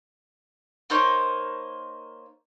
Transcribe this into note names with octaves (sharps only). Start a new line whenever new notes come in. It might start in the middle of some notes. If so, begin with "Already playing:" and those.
A#3 D#4 C5 C#5